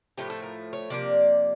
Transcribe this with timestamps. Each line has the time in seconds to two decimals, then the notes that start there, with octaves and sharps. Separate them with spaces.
0.18 A2 F3 A3 G4
0.30 A4
0.42 A#4
0.73 C#5
0.90 C3 F3 A#3 D5